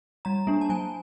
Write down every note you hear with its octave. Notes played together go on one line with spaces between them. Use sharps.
G3 A#5
A#3 D4
A5
F#3 G#5